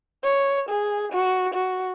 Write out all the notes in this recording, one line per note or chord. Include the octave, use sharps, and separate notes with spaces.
C#5
G#4
F#4
F#4